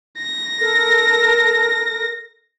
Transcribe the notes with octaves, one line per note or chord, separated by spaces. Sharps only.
A#6
A4 A#4